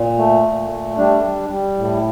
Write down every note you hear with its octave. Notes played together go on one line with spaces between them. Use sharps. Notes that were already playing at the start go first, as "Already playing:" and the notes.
Already playing: A#2
A3
A#2
A3
G3 D4
G3
G3
A2